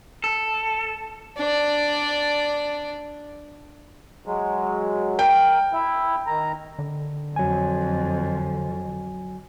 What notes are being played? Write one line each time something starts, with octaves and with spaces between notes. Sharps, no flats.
A4
D4 D5
F#3 G#3
A#4 G5
E4 E5
D#3 A#5
D3
F2 F#3 G#5